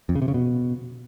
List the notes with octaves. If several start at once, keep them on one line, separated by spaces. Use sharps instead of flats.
F2
C#3
C3
C#3
B2